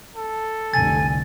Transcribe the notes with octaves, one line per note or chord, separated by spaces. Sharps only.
A4
F1 C2 D3 G#5 A6